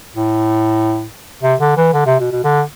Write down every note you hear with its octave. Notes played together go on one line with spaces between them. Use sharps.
A2
C3
D3
E3
D3
C3
B2
B2
D3